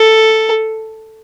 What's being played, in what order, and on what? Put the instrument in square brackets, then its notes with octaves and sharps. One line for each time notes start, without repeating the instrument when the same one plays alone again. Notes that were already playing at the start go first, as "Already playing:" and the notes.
Already playing: [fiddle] A4